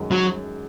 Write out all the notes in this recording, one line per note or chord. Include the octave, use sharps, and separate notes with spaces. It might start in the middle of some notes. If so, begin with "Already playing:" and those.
Already playing: F#2 D#3 G#3 C#4
F#3